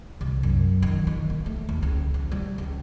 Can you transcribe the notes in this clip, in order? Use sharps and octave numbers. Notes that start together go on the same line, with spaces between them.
C2
F#2
D#3
D#3
C4
A3
D#2
C#2
F2
G3
C#2